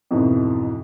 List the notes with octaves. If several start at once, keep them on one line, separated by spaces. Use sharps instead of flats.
F2 G#2 B2 E3